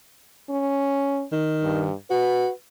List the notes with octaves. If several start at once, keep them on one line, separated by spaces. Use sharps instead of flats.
C#4
D#3
G2
F#4 B4